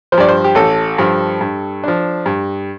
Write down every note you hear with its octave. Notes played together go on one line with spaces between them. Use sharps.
F3 C5
G2 D5
C5
G4
A1 A4
G2 F3
G2
F3 D4
G2